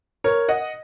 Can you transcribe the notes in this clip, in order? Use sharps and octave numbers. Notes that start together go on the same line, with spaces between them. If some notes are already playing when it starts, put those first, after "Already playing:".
A#4 C#5
D#5 F#5